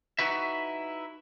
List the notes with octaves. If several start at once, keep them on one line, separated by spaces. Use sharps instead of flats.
D#4 E4 F#4 B4 E5